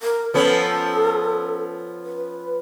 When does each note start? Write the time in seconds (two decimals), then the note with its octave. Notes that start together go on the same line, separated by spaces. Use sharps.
0.01 A#4
0.34 F3 B3 C#4 A4
2.06 B4